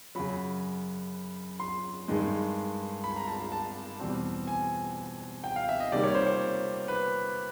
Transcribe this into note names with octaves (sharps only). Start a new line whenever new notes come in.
F#2 C#3 F#3 B5
C6
G2 D#3 G#3
B5
A#5
A5
A5
A5
E2 B2 G3 C4
G#5
G5
F5
E5
D#5
C3 D#3 G3 A#3 D5
C#5
C5
C#5
B4